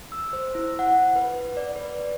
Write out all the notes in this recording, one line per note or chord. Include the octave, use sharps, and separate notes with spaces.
E6
C5
E4
F#5
B4
D5
B4